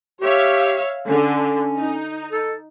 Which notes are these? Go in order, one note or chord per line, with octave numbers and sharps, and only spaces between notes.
G4 C#5 E5 F5
D3 C#4
D#4
A4